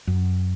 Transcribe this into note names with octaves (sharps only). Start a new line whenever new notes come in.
F#2